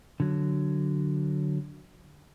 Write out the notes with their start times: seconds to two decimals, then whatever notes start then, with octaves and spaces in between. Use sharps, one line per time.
0.20 D3 F#3